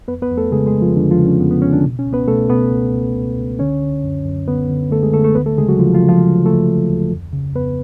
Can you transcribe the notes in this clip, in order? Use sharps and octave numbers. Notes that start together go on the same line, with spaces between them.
F2 B3 B4
B3 B4
F2
A3 A4
C#3 G#3 G#4
G#3 G#4
C#3
F3 F4
F2 D3 D4
F3 F4
C#3
C#4
F2 B3
B3
C#3 C#4
D3 D4
B2
C#4
C#2
B3 B4
B2 A3 A4
B2 B3 B4
C#2
C#2
C#2
C#2
D3 C#4 C#5
D3
F#2
F#2
D3 B3 B4
D3
D3 A3 A4
G#3 G#4
D3 A3 A4
A3 A4
D2 B3 B4
A3 A4
C#3 G#3 G#4
F#3 F#4
C#3 F3 F4
F3 F4
C#3
F3 F4
C#3
C#3 A3 A4
C#3
D2
F2
C#3
F2 B3 B4